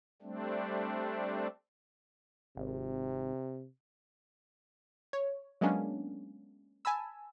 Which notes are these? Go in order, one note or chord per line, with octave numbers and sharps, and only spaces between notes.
G3 A3 C4 D4
G#1 C3
C#5
F#3 G#3 A#3 B3 C#4 D4
G#5 A5 B5 E6